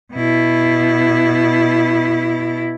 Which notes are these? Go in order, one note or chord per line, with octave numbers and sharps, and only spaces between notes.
B2 E4